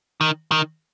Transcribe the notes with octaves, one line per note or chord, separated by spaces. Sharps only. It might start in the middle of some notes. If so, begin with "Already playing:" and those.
D#3
D#3